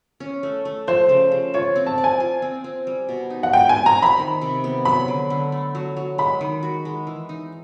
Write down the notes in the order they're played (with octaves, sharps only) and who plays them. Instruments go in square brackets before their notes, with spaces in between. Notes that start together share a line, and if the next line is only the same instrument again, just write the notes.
[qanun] C#4
A3
A3
[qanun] F3 [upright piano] C5
[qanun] C#3
C#3
[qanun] F4 [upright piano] C#5
[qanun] C4
[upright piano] A5
[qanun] D5
[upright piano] G#5
[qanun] F4
C4
C4
G3
B2
D#4
[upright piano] F#5
[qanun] F4 [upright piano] G5
[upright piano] G#5
[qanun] C4
[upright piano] A#5
[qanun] C5
[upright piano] B5
[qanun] D#3
C3
B3
[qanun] F#3 [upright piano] B5
[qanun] D3
D3
A3
F#3
F#3
[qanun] G#3 [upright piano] B5
[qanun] D#3
F#4
G#3
E3
D#4